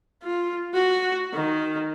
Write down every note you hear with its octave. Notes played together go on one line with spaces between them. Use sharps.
F4
F#4
D#3